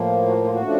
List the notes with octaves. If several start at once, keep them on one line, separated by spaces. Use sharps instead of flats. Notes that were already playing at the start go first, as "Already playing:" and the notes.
Already playing: A2 F3 A#3
F#4
F4
F#4
C#3 F3 A3 D4